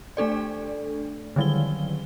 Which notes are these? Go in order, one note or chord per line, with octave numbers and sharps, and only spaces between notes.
A3 D4 A4 D5
D3 D#3 F#3 G3 G7